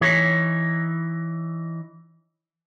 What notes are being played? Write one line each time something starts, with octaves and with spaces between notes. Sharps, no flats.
E3 D#4 C#5